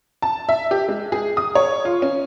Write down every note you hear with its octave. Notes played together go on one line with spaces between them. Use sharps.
A5
E5
G4
G#3
G#4
D#6
C#5
F4
C#4